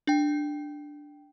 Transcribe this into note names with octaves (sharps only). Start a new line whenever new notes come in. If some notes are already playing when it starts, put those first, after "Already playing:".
D4 G5